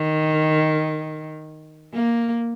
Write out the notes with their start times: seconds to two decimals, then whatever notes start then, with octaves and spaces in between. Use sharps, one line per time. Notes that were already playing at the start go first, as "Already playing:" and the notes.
Already playing: D#3
1.93 A#3